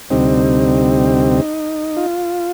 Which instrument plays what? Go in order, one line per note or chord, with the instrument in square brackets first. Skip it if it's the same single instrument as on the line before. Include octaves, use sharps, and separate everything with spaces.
[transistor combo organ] D2 C3 G3 C4 D#4
F4